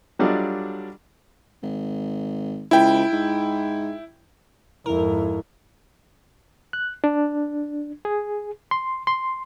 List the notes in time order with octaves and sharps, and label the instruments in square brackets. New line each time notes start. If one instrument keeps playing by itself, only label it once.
[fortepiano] F#3 G3 D4 F4 A4 D#5
[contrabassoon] G#1
[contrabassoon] C#2 [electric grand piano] E4 G5
[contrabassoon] G#2
[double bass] F2 G#2 [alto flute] E4 [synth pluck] A#4
[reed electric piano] F#6
D4
G#4
C6
C6